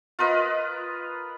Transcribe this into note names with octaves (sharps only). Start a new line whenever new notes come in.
F4 A#4 B4 D#5